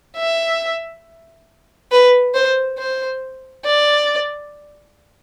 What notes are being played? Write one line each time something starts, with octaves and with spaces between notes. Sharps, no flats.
E5
B4
C5
C5
D5